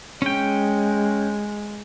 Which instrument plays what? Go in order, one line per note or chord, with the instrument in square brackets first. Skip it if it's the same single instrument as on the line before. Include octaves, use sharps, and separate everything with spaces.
[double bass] G#3 [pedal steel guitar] C#4 G5